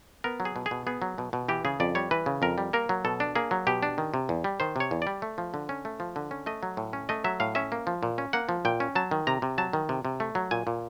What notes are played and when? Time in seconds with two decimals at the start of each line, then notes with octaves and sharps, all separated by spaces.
0.24 B3 A#4
0.40 F#3
0.45 G#4
0.56 B2
0.66 G#4
0.71 B2
0.87 B3 G#4
1.02 F#3
1.18 B2
1.33 B2
1.49 E3 G4
1.65 C#3 G#4
1.80 F2 D5
1.95 G3 C#5
2.11 E3 B4
2.26 C#3
2.42 F2 A#4
2.58 G3
2.73 A#3 A#4
2.89 F#3
3.05 B2 A4
3.20 D4
3.35 A#3 G#4
3.51 F#3
3.67 B2 G4
3.83 D4
3.98 D#3
4.14 C3
4.29 E2
4.44 G3
4.60 D#3 C5
4.76 C3 C#5
4.91 E2
5.02 G3 D5
5.22 A3
5.38 F3
5.54 D3
5.69 C#4
5.85 A3
6.00 F3
6.16 D3
6.31 C#4
6.46 A3 D#5
6.63 F#3
6.77 A2
6.93 C#4
7.09 A3 D#5
7.24 F#3 E5
7.40 A2 F5
7.55 C#4 E5
7.72 A#3
7.87 F3
8.03 A#2
8.18 C#4
8.33 A#3 F#5
8.49 F3
8.65 A#2 G5
8.80 C#4
8.95 F#3 A5
9.11 D#3
9.27 C3 A#5
9.42 C3
9.58 F#3 A5
9.73 D#3
9.89 C3
10.05 C3
10.20 A3
10.35 F#3
10.51 A#2 G#5
10.67 A#2